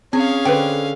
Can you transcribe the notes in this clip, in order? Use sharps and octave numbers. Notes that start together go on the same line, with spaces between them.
C4 C#4 G#4 F5
D3 B4 C5 G5